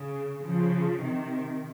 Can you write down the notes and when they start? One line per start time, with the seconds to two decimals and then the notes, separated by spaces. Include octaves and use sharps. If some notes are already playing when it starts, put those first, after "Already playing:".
Already playing: C#3
0.42 C#3 F3
1.01 C3 D#3